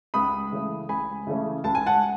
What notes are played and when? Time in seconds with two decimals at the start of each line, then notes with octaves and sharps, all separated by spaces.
0.14 C#2 B5 D#6
0.52 C#3 E3 A3 C#4
0.89 C#2 G#5 B5
1.27 C#3 E3 A3 C#4
1.64 C#2 A5
1.75 G#5
1.86 F#5 A5